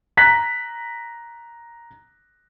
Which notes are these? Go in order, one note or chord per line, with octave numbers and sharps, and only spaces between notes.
A#5 F#6 B6